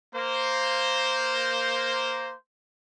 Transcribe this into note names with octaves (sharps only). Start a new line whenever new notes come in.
A#3 C5